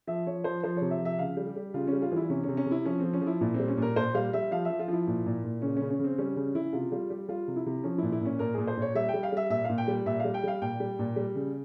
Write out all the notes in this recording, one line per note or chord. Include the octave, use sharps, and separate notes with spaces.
F3 E5
F3 C#5
F3 C5
F3 C5
C3 C#5
E5
F3 E5
C#3 F5
G3
G4
G3
C#3 F4
G3 C#4
F4
E3 E4
C3 C#4
C3 C#4
C#4
C3
E4
F3 C#4
F3 C4
C#4
F3 E4
A#2 E4
G3 C4
C#4
A#2
A#4
A#2 C5
G3 F5
G3 E5
F3 F5
F3 E5
F4
F3 E4
A#2
A#2
A#2
C#3 C#4
C#3 C#4
C#4
C#3 C4
G3 C#4
C#3 C#4
C#3 E4
C3 F4
G3 F4
G3 G4
G3 F4
C3
E4
C3
F3 C#4
A#2 E4
E4
A#2 C#4
A#2 A#4
A#2 G#4
C5
A#2 C#5
G3 E5
G5
G3
F5
G3 E5
A#2 E5
A#2 F5
G5
G3
A#2 E5
G3 F5
G5
G3 F5
A#2 G5
G3
A#2
G3
C#3